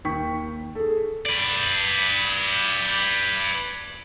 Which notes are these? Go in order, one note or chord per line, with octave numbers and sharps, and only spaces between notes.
D#2 G5 C#6 B6
G#4 A4
B4 D5